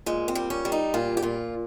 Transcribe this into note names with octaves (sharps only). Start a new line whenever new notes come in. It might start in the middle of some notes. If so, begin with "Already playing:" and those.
A#2 G#3
C4
G3
C#4
G3
D#4
A#2 F4
G4
A#2 F4